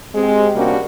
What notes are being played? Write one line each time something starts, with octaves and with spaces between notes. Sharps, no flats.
G#3 C4 G4
C3 G3 A#3 C#4 D4 F#4